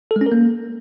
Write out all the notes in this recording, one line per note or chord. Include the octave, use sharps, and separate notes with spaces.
A4
G#3
C#4
A#4
A#3